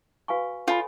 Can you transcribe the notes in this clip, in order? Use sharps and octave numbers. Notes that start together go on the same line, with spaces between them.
F#4 B4 F5 G#5 C#6
F4 A4 C#5 G#5 B5